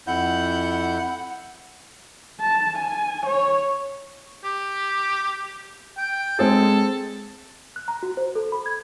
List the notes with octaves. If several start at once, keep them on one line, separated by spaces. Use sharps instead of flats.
F2 E4 F#5 G6
A5
G#5
C#5
G4
G5
G#3 C4 G#4 A4
F#6
A#5
F#4
C5
A4
B5
G#6